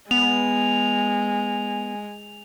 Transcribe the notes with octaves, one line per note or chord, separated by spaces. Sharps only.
G#3 B3 F7